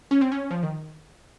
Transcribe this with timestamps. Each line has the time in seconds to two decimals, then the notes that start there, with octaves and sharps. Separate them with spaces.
0.11 C#4
0.21 C4
0.32 C#4
0.51 F3
0.63 D#3